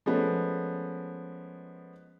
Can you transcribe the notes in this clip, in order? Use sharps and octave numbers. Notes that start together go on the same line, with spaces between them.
F3 G#3 A3 B3 C#4